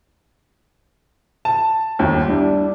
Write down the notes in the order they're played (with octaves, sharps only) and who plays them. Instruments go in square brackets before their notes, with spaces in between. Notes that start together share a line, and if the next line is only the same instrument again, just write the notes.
[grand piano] A5
G1 D#2
[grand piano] G3 E4 [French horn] D4